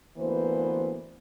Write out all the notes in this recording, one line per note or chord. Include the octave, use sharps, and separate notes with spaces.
D2 E3 A#3 B3 C5